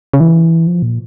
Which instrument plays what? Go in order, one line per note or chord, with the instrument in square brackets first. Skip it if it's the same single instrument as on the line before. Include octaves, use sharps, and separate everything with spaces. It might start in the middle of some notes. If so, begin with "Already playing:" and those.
[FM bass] C#3
E3
F3
A#2